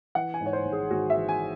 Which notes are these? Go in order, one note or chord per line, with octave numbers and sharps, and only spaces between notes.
E3 F#5
G#5
G#2
C#5
C5
G#1
G#4
G#1 F#4
E5
E3
G#5